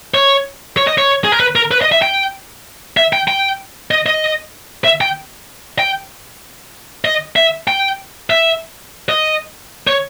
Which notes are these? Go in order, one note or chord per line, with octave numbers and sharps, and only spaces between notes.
C#5
C#5
D#5
C#5
G#4
A#4
B4
A#4
B4
D#5
E5
G5
E5
G5
G5
D#5
D#5
E5
G5
G5
D#5
E5
G5
E5
D#5
C#5